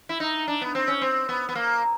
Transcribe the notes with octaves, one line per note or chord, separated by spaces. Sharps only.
E4
D#4
D4
B3
C4
C#4
C4
B3
B3
A#3